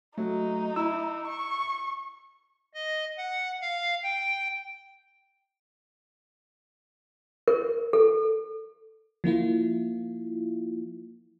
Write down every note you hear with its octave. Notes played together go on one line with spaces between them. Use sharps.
F#3 A3 D#4
E4 E6
C#6
D#5
F#5
F5
G5
A#4
A4
F3 A#3 E4 F4